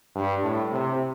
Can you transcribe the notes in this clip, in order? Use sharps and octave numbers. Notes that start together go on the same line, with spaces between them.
G2
A2
C3